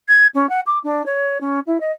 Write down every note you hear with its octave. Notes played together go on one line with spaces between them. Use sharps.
G#6
C#4
F#5
D6
D4
C#5
C#4
E4
D#5